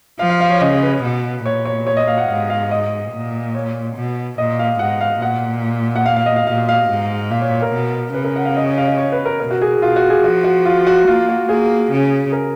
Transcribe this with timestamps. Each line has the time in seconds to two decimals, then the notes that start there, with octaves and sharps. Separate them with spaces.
0.19 F3 F5
0.29 F5
0.40 F5
0.50 C#5
0.61 C#3 D#5
0.83 B4
1.03 B2
1.44 A#2 C#5
1.65 C#5
1.87 C#5
1.97 D#5
2.07 F5
2.18 F#5
2.28 G#2 F5
2.50 F5
2.71 D#5
3.12 A#2
3.55 C#5
3.96 B2
4.38 A#2 D#5
4.59 F5
4.79 G#2 F#5
5.01 F5
5.22 A#2 F#5
5.96 F#5
6.06 F5
6.16 F5
6.26 D#5
6.36 F5
6.47 A#2 F5
6.69 F5
6.89 G#2
7.30 A#2 F5
7.41 C#5
7.52 C#5
7.62 A#4
7.73 B2
8.14 C#3 B4
8.25 A#4
8.36 F#5
8.45 F5
8.57 D#5
8.66 C#5
8.78 F5
8.87 D#5
8.98 C#5
9.12 B4
9.25 A#4
9.40 B2 A#4
9.51 F#4
9.61 G#4
9.82 B2 F4
9.96 F#4
10.10 G#4
10.24 F3 F#4
10.44 F#4
10.65 F4
10.87 F#4
11.07 A#3 F4
11.29 F#4
11.49 A#3 G#4
11.91 C#3
12.32 A#4